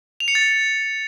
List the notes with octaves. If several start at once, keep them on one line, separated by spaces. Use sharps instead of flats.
F7
C#7
A6